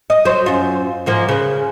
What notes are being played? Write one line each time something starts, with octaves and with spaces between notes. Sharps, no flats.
D#5
F#3 C5
F#2 F4
G#2 F3 A#3
C#3 B4